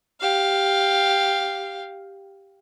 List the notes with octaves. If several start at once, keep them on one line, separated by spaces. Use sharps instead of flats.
G4 F5